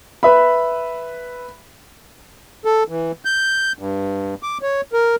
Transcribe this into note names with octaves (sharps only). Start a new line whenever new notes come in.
B4 E5 B5
A4
E3
G6
G2
D6
C#5
A#4